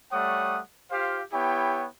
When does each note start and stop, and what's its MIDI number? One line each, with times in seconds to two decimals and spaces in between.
0.12 0.60 55
0.12 0.60 57
0.12 0.60 73
0.12 0.60 78
0.12 0.60 87
0.91 1.22 65
0.91 1.22 67
0.91 1.22 72
0.91 1.22 77
1.32 1.86 59
1.32 1.86 64
1.32 1.86 67
1.32 1.86 73
1.32 1.86 79